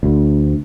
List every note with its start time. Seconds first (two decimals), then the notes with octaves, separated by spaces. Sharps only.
0.03 D2